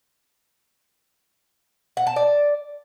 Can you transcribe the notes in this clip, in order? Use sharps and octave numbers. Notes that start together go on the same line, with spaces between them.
F#5
A5
D5